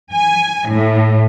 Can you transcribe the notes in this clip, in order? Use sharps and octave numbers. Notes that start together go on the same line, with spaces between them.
G#5
A2